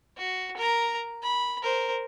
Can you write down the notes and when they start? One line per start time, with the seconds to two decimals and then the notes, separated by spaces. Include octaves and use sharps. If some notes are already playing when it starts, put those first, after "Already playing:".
0.18 F#4
0.57 A#4 A#5
1.22 B5
1.63 A#4 C5